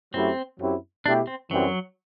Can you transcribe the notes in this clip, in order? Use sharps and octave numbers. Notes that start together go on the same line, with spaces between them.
F#2 F#3 A3 C4 E4 G4
F#2 F#3 C4 E4 G4
B2 A3 D4 E4 G4
C4
F#2 E3 F#3 G3 C4 F#4